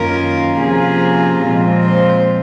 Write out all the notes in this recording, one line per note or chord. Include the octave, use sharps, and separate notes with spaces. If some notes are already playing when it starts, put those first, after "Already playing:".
Already playing: F#2 D#3 A#3 C#4 F4 A#4
C3 F3 A#3 C#4 F4 G#4
A#2 F3 G#3 C4 F4
C5